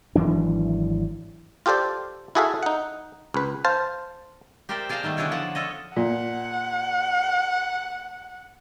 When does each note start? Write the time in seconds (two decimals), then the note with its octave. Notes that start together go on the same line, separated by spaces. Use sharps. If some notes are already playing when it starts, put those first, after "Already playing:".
0.16 G#1 E3 F#3 D4
1.66 F4 G4 A4 C5 D5
2.35 E4 F#4 G#4 A4 E5 F5
2.63 D#4 F#5
3.34 C#2 B4
3.65 C5 F5 A5
4.69 G4 A#4 C5 D5 E5 G5
4.89 G#4 D5 F5 G5 A5 A#5
5.03 D#3 G3 A3 B3
5.17 D3 D4 E4 G#4 C#5 D5
5.31 F3 B3 F#5 A5
5.55 F4 A4 C#5 D#5
5.96 A#2 F#5